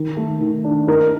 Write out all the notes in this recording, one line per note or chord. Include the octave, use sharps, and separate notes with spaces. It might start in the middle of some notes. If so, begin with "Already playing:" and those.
Already playing: D#3
A3
D#3
D4
D#4 A#4